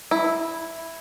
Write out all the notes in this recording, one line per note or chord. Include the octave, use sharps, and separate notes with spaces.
E4